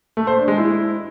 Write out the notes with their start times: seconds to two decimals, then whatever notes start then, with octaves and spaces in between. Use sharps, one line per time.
0.17 A3
0.27 C5
0.37 D4
0.48 G#3
0.58 E4